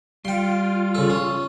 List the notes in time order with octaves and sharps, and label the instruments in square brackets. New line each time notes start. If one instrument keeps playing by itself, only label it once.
[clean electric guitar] G3 [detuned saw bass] F4 [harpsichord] G5 C6
[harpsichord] C#3 A4
C#4